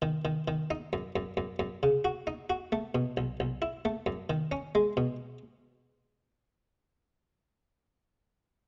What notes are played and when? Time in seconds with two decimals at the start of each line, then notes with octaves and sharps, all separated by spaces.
0.02 D#3
0.25 D#3
0.48 D#3
0.70 D#4
0.93 F#2
1.16 F#2
1.37 F#2
1.59 F#2
1.83 C#3
2.05 F#4
2.27 D#4
2.50 F#4
2.72 A3
2.95 B2
3.17 B1
3.40 B1
3.62 E4
3.85 A3
4.06 F#2
4.30 D#3
4.52 C#4
4.75 G#3
4.97 B2